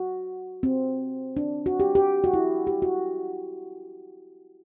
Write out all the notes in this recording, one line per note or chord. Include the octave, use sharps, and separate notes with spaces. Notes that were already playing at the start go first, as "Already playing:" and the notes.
Already playing: F#4
C4
D4
F#4
G4
G4
F#4
E4
G4
F#4